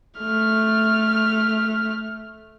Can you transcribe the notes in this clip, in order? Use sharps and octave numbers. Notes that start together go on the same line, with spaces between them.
A3 F6